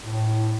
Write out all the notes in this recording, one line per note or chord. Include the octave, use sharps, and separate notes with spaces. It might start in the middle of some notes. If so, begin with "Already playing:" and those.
A2